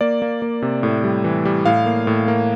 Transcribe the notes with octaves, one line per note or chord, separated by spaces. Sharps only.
A#3 D5
A#3
A#3
C3
A2
G3
E3
G3
A2 F5
A#3
A2
A#3